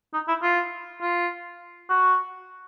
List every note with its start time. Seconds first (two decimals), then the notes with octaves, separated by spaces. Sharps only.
0.14 D#4
0.28 E4
0.43 F4
1.01 F4
1.90 F#4